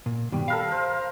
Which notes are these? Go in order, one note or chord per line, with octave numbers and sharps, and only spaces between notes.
A#2
G2 B2 D#3 G3
A4 A#4 F5 B5
A#4 C5